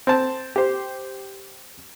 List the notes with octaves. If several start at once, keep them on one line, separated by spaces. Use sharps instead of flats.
C4 A5
G4 C5